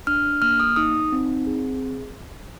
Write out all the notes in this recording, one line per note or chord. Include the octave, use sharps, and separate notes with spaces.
D4 F6
A#3 F6
D#6
D#4 D#6
C4
G#4